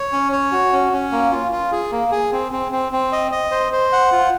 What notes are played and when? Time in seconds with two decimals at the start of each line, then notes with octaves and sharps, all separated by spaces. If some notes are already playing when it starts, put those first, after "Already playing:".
Already playing: C#5
0.12 C#4
0.32 C#5
0.52 F#4
0.73 C#4
0.93 C#4
1.12 A#3
1.32 F4
1.52 F4
1.72 G#4
1.91 A#3
2.11 G#4
2.32 C4
2.52 C4
2.72 C4
2.92 C4
3.12 D#5
3.32 D#5
3.51 C5
3.72 C5
3.92 F#5
4.12 F4